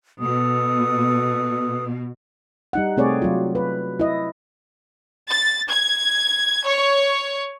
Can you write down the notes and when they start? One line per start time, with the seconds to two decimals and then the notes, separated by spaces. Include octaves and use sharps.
0.20 B2 A4 B4 D#6
2.73 G3 D#4 F#5
2.97 C3 A3 C4 G#4 C#5 D5
3.22 F#3 F4
3.55 B4
4.00 E4 D#5
5.28 A6
5.70 G#6
6.66 C#5